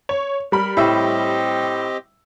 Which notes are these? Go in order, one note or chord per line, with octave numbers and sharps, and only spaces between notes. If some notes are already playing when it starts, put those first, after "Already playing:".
C#5
G3 A#4 B5
A2 C4 G4 D#5 E5 E6